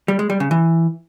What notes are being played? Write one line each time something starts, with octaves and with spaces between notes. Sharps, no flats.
G3
G#3
G3
C#3
E3